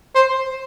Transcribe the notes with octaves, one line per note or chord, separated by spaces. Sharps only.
C5